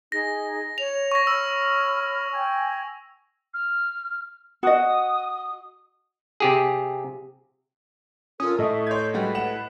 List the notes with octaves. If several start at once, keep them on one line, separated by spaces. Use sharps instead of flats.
D#4 G#4 A#6
C#5 F7
C#6 A#6
C#5 B5 E6 F6
G5 G#5 G#6
F6
F#4 D#5 D#6
C3 G4 G#4
C#4 F4 A4 A#4 D#6
A2 A4 D#5 E5 C#6 D#6
C#5 C6 G6 G#6
G3 G#3 F#4 B4
F#5 E7